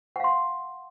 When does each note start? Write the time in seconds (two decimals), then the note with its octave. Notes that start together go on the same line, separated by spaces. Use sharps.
0.16 F#5
0.20 F5
0.24 C6